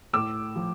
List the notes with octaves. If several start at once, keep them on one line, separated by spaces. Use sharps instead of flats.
A2 D6 E6
F3